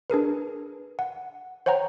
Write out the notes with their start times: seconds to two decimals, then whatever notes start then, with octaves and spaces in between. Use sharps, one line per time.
0.10 D4 G#4 A#4 B4
0.99 F#5
1.66 C5 C#5 F#5 G5 A#5